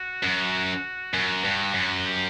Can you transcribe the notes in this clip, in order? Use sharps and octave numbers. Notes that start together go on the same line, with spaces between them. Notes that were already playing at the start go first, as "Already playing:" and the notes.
Already playing: F#4
F#2
F#2
G2
F#2
G4